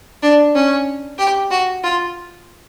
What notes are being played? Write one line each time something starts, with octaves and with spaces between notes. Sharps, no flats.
D4
C#4
G4
F#4
F4